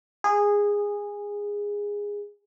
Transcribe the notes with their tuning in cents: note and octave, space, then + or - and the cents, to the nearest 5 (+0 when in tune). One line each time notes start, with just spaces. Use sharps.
G#4 -15